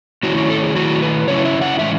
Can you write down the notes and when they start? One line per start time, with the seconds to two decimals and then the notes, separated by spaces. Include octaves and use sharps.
0.23 D#3 A3 C#4 E4 F#4
0.37 F#4
0.50 A4
0.63 G#4
0.75 D#3 A3 E4 F#4
1.02 B4
1.27 C#3 F#3 C#4 E4 C#5
1.45 E5
1.61 F#5
1.79 A2 E3 G#3 C#4 E5